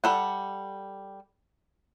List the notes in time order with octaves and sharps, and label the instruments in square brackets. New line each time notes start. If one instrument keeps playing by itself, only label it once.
[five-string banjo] G3 A4 F#5